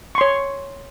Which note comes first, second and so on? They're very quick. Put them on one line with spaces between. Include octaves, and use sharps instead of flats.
C#6 C6 C#5